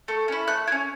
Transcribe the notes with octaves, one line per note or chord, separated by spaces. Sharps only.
A3
C#4 E4
A3 F#6
E4
C#4